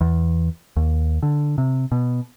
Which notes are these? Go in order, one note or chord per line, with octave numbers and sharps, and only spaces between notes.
E2
D#2
D3
C3
B2